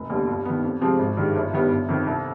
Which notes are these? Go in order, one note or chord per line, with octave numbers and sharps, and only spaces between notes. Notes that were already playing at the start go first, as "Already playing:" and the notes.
Already playing: F1
D#2 D3 G3 B3
G2
D#3 B3
F2
C3 F3 G#3 C4
G#1
G2 D#3 G#3
G1
G2 D#3 G3 B3
G1
F2 D#3
C2